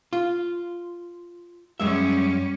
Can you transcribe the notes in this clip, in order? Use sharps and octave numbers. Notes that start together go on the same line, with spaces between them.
F4
F#2 G3 G#3 C#4 E5